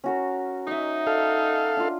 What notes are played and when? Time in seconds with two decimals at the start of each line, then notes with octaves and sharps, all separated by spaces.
0.04 C#4 F#4 A#4
0.67 D#4 D#5 E5
1.07 A4 F5
1.77 D4 F4